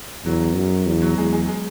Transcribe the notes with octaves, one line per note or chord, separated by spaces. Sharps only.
E2 F#3
F#2
E2
F#3
E2 G#3
G#3
G#3